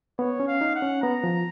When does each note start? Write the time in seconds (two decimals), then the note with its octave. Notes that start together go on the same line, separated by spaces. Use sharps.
0.19 B3 C#5
0.40 C#4
0.48 F5
0.61 D#4
0.76 F#5
0.82 C#4
1.02 B3 A#5
1.24 F3